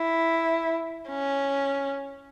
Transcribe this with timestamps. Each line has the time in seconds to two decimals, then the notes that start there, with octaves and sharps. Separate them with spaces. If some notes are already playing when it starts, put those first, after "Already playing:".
Already playing: E4
1.09 C#4